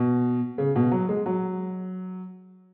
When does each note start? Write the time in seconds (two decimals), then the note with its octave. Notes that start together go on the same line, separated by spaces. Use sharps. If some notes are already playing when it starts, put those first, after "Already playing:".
Already playing: B2
0.58 C#3
0.76 B2
0.91 F#3
1.09 G#3
1.26 F#3